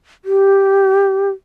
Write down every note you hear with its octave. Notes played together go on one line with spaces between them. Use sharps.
G4